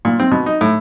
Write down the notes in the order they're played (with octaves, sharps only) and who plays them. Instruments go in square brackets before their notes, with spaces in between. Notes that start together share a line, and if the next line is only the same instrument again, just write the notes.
[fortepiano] A#2
C4
B2
D#4
A2